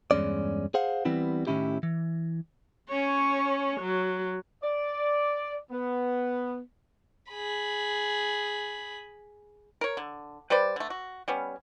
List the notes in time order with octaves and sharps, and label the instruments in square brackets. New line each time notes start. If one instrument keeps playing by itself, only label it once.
[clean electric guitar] E2 G2 G#3 C#4 D5
G#4 C5 F5 F#5
E3 G3 B3 C4 E4
A2 D#3 F3 C#4 E4 G4
E3
[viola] C#4 C#5
F#3
[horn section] D5
B3
[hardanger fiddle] G#4 B5
[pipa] A#4 C#5
D3
G3 B4 C5 D5
D3 A3
F#4
G3 B3 C#4